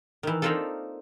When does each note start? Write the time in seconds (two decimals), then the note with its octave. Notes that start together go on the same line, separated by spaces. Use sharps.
0.23 D#3 E3
0.42 A#3 C4 D4 D#4 F4 A4